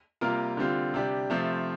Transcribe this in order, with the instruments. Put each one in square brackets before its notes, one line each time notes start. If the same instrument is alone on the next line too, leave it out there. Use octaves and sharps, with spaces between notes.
[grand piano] C3 G3 A#3 F4 A#4
D3 G3 C4 F4
C3 G3 D4 G4
C3 F3 A3 C4